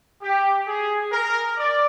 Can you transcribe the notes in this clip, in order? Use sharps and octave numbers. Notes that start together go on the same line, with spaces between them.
G4
G#4
A#4
D5